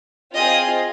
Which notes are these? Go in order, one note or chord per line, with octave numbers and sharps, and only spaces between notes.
C4 F4 G#4 D#5